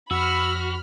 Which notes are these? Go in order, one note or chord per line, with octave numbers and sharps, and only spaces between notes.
F2 F#4 B5 E6 F6